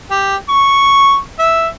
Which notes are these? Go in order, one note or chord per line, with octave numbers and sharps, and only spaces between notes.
G4
C#6
E5